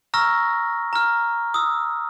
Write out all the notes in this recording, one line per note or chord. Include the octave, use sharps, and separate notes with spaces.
A#5 C#6 E6 F6 A#6
A#5 F6
D#6 E6